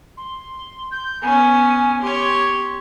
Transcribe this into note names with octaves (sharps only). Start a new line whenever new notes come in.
C6
G6
B3 C#4 G#5
G4 C#5 C6